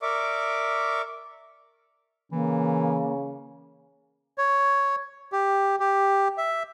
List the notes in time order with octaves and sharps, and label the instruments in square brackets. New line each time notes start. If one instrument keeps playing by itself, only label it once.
[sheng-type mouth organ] A#4 D5 E5 C#6 D6
[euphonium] C#3 [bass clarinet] E3 [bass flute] A#3
[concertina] C#5
G4
G4
E5